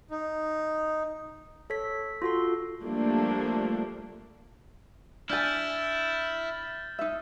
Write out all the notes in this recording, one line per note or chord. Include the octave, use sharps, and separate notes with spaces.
D#4
A4 C#5 B6
F4 F#4 A4 C6
F3 G3 A3 A#3 D4
D4 E4 G#5 F6 G6 A6
D#4 E5